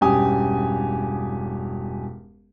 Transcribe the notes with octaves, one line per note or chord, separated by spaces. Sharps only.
E1 G2 C#4 G4 G#5 D#6